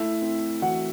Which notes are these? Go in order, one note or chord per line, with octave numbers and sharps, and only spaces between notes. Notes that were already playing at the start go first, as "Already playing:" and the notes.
Already playing: A3 E4 E5
C4
E3 F#4 F#5